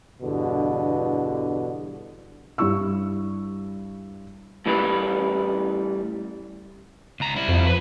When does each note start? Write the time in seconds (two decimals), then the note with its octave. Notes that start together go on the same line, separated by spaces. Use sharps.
0.22 E2 G2 B2 D3
2.58 G2 G3 E4 C#6 E6
4.66 A2 E3 G3 B4
7.20 C#2 A#5
7.36 G3 E4
7.48 F2
7.67 B4